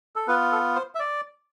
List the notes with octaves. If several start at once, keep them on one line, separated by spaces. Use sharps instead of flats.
A4
B3 F4 B4
A4
C5
E5
D5